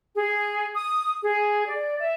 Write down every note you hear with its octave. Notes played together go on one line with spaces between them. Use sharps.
G#4
D#6
G#4
D5
E5